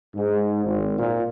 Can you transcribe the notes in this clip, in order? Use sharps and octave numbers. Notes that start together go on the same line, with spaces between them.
G#2
G#1
A#2